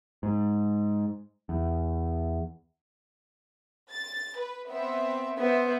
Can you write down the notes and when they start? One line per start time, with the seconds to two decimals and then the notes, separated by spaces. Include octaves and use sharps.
0.23 G#2
1.49 E2
3.91 A6
4.39 B4
4.69 B3 C4 E5
5.39 B3 C5 E5